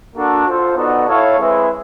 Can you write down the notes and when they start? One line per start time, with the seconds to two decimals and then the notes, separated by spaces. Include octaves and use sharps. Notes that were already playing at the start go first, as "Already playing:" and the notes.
0.15 A#3 D4 F#4 A4
0.45 F4 A4 C5
0.76 B3 D#4 F#4 A4 D5
1.07 E4 A4 C#5 F5
1.38 G#3 C4 E4 G#4 B4